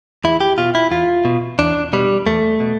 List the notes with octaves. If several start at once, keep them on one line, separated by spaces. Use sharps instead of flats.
E2 E4
G4
B2 F4
E4
E2 F4
B2
E2 D4
B2 G3
E2 A3
B2